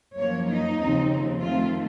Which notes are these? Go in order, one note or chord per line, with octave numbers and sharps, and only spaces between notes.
F#2 F3 A#3 C#5
D#4
D#2 C#3 F3 C4
F2 D#3 A3 C4 F4